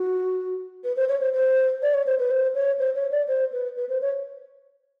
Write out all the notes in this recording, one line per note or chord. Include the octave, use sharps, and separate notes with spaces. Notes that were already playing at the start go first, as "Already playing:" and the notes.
Already playing: F#4
B4
C5
C#5
C5
C5
D5
C#5
C5
B4
C5
C#5
C5
C#5
D5
C5
B4
B4
C5
C#5